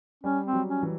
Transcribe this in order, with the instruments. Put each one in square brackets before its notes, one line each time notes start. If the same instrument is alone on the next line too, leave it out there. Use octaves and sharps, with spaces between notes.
[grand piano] G3 [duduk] C#4
[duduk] C4
[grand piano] F#3
[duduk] C#4
[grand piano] E3